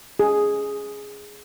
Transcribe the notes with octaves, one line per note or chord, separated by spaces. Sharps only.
G#4